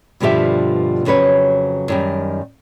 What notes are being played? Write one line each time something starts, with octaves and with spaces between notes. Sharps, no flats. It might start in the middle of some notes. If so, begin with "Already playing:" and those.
G2 B2 D3 F3 G4 E5
F2 C#3 F#3 B4 C#5
F#2 D#3 G3